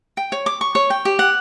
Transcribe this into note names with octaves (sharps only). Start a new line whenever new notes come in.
G5
C#5
D6
C#6
C#5
G5
G4
F#5